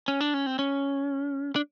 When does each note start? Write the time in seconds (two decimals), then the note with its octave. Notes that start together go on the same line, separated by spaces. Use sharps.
0.08 C#4
0.21 D4
0.34 C#4
0.46 C4
0.59 C#4
1.56 D4